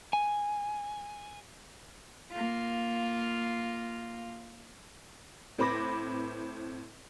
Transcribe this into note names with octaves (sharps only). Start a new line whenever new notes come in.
G#5
A#3 F4
A2 C4 B4 B5 D6 A#6